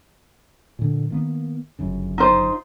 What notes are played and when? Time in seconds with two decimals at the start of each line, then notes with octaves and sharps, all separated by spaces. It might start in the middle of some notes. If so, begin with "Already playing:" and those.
0.79 A#2 D3
1.10 D#3 A#3 B3
1.79 G1 F#2 C#3
2.18 D#4 F4 C5